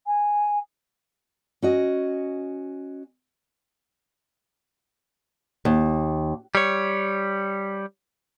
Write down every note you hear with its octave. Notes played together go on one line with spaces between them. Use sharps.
G#5
C#4 F#4 D#5
D#2
G3 C#5